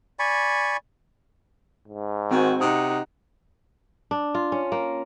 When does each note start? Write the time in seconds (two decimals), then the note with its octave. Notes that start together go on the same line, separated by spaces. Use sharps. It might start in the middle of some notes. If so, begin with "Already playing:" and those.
0.19 D5 G#5 B5 C#6
1.88 G#2
2.31 D#3 C4 F#4 G#5
2.61 C3 D#4 F#5 D#6
4.11 D4
4.35 F4
4.52 C#4
4.72 A#3